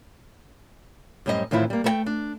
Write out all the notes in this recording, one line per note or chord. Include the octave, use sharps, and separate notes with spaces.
F#2 A2 G3 C4 G#4 D#5
A2 D#3 E3 C4 E4 F4
G3 A#3
A3 B4 G5
D4